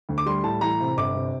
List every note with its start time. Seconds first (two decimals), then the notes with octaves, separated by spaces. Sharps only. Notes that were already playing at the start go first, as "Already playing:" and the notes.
0.09 D2
0.18 D6
0.26 G3 C6
0.43 A2 A5
0.61 E3 A#5
0.80 C3
0.97 G1 D6
1.15 C3